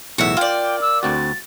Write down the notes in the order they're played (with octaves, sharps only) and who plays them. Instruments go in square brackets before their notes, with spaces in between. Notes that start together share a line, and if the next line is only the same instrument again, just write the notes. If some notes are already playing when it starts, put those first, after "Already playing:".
[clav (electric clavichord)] B1 E2 A2 [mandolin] F#4 E5
[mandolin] A#3 D5 [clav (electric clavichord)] F4 [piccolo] G5
[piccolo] E6
[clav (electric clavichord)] D2 C4 F#4 [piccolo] A6